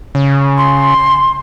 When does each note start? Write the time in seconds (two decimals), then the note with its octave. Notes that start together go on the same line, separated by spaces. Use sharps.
0.15 C#3
0.58 C6